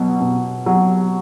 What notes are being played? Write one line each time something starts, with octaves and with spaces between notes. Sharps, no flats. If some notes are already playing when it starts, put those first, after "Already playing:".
Already playing: B2 F#3
B2
F#3